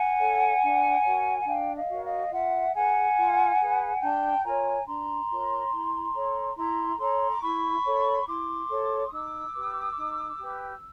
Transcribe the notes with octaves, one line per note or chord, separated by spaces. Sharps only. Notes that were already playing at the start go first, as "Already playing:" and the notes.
Already playing: F#5 G#5
A4 C#5
D4
F#4 A#4 C#5
F#5
D4 F5 G5
D#5 F5
F#4 A#4 C#5
D#5 F5
F4 E5 F#5
G#4 B4 F#5 G#5
F4
G#4 B4
D4 G5 A5
F4 A#4 C#5 G#5 A#5
D4 A#5 C6
F4 A#4 C#5
E4
A4 C#5
E4 A#5 C6
A4 C#5 A#5 C6
D6
E4 B5 C#6
A4 C#5
E4 C6 D6
A4 C#5
D#6
D#4 D6 E6
G4 B4
D#4
G4 B4